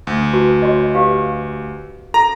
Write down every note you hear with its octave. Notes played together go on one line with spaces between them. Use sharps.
D2 D#6
F#4 B4 A5
F#4 C#5 D#5
G4 B4 F5
A4 A#5